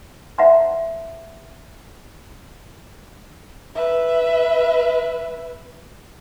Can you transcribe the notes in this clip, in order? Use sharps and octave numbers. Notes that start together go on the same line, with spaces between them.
C5 E5 F#5 A5 A#5 C6
B4 E5